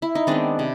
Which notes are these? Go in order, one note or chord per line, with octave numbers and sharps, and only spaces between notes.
E4
D#4
D#3 G#3 B3 C4 D4
C3